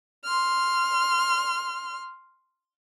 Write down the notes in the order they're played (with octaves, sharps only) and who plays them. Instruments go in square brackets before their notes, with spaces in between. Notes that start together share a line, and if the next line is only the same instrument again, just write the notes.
[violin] C6 F6